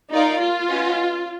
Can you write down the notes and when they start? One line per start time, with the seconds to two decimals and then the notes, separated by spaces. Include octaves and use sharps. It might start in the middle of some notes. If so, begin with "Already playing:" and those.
0.12 D#4 F4 A#4 D5 F5
0.40 F4
0.68 C#4 F#4 B4 D#5